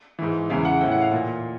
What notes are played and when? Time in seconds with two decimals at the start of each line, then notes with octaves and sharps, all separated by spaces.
0.19 G#2 E3
0.50 E2 C#3 E3 F5
0.65 F#5
0.81 A2 G5
0.85 E3
0.92 F#5
1.01 F5
1.12 A#2